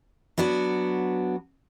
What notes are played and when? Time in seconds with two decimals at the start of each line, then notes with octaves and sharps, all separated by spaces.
0.38 F#3 B3 D4 F#4